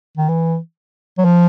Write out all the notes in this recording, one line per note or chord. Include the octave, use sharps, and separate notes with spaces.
D#3
E3
F#3
F3